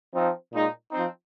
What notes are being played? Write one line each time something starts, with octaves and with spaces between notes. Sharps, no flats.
F3 C4 D#4
A#2 G#3 D#4
F3 C4 D#4